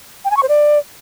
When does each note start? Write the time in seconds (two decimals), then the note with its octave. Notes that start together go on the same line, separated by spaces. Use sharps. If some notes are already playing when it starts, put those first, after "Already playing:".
0.25 G5
0.31 G#5
0.37 C#6
0.43 C5
0.49 D5